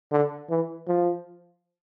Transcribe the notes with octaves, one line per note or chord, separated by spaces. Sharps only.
D3
E3
F3